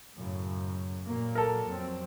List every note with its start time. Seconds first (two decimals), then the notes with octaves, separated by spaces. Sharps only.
0.17 F#2 A2 C#3
1.05 A#2 F#3 A#3
1.35 A4 A#4
1.66 F2 F#3 C4